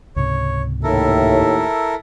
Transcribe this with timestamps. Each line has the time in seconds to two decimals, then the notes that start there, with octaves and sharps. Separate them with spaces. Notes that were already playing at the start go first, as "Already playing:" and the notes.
0.16 C#2 G#2 C3 C#5
0.83 D#2 A2 E4 A4 A#4